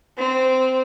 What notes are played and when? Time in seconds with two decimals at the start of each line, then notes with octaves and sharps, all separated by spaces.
0.18 C4